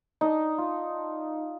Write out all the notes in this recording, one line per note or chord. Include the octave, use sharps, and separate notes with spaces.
D4 D#4 D#5
F4